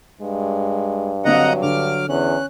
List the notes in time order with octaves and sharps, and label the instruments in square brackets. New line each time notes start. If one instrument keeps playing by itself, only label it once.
[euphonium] G2 [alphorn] G#3
[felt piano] D3 C4 F5 [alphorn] F#3 [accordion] D#5 F#5 A#5
[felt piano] D3 [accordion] D6 F6
[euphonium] E2 [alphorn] C#4 [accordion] F#6